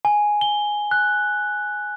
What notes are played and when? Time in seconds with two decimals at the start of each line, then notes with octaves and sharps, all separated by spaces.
0.05 G#5
0.41 G7
0.91 F#6